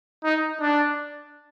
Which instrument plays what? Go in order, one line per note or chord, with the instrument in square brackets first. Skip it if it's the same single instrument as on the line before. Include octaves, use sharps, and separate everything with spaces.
[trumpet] D#4
D4